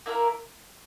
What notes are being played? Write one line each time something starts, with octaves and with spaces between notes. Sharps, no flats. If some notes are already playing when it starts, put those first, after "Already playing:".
A#3 E4 A#4